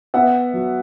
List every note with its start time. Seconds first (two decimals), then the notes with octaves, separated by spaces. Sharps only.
0.14 B3 E5 F#5
0.54 F#3